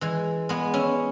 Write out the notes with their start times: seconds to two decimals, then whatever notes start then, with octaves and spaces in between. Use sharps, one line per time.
0.01 E3 G#3
0.49 G#3 B3
0.74 C#4 E4